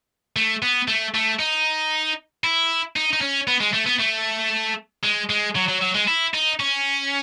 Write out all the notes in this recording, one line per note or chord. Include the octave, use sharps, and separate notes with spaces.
A3
B3
A3
A3
D#4
E4
D#4
D#4
C#4
B3
G#3
A3
B3
A3
G#3
G#3
F#3
F#3
F#3
G#3
E4
D#4
C#4